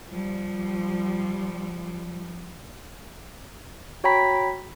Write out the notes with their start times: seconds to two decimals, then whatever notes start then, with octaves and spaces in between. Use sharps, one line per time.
0.11 F3 G3
4.04 F#4 C#5 G5 A#5 B5 B6